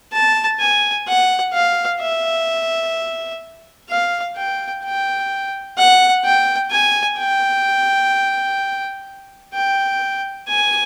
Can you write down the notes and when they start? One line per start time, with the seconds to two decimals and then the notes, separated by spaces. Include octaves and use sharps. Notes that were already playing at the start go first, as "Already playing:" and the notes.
0.13 A5
0.60 G#5
1.07 F#5
1.54 F5
2.00 E5
3.89 F5
4.36 G5
4.84 G5
5.78 F#5
6.24 G5
6.71 G#5
7.18 G5
9.54 G5
10.48 G#5